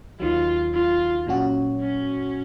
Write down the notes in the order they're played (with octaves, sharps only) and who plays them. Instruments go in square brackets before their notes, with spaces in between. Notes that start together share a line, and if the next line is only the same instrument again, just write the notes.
[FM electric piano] D#2 D#3 F#3 [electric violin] F4
[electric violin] F4
[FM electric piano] A#2 F#3 C#4 F#4
[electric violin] C#4